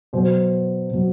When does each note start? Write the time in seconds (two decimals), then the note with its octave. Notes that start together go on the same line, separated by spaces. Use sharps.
0.13 B2 F#3 C5
0.90 B2 F#3